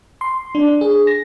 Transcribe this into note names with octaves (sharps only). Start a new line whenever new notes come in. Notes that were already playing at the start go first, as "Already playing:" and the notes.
C6
D4
G#4
A#6